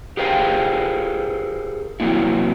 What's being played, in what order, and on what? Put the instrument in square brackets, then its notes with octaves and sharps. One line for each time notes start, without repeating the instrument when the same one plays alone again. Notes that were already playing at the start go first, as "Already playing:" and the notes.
[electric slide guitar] G4 G#4 A#4 C5 F5 G5
C3 E3 F#3 G#3 A#3 E4